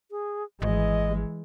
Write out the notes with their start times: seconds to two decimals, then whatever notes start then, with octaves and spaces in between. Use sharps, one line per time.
0.11 G#4
0.62 G#1 E3 G#3 D#5